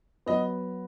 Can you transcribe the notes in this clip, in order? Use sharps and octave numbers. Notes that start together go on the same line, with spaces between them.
F#3 B3 D#5